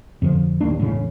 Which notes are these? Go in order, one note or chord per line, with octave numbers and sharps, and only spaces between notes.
F2 D3 D#3 F3
D1 D#2 A#3 D4
E1 A2 C#3